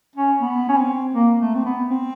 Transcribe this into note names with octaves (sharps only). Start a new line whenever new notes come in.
C#4
B3
C#4
C4
A#3
A3
C4
B3
C4